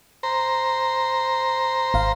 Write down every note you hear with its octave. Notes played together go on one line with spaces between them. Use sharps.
C5 A#5
G#1 F5